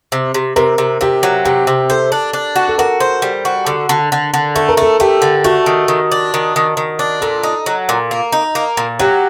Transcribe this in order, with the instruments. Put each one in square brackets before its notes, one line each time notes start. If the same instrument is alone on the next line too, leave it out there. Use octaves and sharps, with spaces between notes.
[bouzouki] C3
C3
[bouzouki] C3 [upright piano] A#4
[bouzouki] C3
[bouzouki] C3 [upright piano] G4
[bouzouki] F#3
[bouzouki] C3 [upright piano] G4
[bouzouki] C3
[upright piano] A4 [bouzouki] C5
[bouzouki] D4
D4
F#4
[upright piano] A4
[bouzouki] F#4 [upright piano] A#4
[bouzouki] C5
G3
F#4
D3
D3
D3
D3
[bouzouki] A3 [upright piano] A4
[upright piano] A#4
[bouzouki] A3 [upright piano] A4
[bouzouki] A3 [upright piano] G4
[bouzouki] D3
[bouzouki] A3 [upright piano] F#4
[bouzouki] D#3
D#3
D4
D#3
D#3
D#3
D4
[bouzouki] A#2 [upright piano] A4
[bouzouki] D#4
F#3
A#2
A#3
D#4
A#3
A#2
[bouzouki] F#3 [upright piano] G4